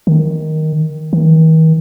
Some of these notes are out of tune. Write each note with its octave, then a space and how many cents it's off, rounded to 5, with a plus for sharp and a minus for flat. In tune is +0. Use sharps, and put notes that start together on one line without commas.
D#3 +5
D#3 +45